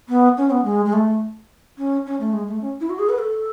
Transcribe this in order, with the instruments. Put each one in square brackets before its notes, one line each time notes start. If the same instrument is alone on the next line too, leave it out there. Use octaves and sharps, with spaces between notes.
[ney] B3
C#4
B3
G#3
G#3
A3
C#4
C#4
A3
G#3
A3
C#4
E4
F#4
G#4
B4
A4